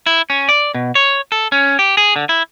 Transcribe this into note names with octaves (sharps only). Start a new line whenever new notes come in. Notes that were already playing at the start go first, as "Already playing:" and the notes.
E4
C#4
D5
B2
C#5
A4
C#4
G4
G#4
D3
E4